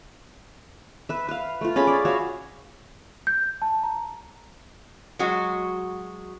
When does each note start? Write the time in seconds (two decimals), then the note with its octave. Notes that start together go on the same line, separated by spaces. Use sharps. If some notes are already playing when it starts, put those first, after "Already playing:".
1.09 B4 E5
1.29 B4 F5
1.61 A3 F4
1.76 C#4 G#4 F5 B5
1.87 D5
2.05 F#4 C#5 E5 F5
3.27 G6
3.62 A5
3.83 A#5
5.19 F#3 G#3 F#4